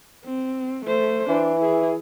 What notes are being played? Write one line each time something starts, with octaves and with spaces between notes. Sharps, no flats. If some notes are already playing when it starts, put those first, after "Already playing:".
C4
A3 C5
E3 D4
E4 G#4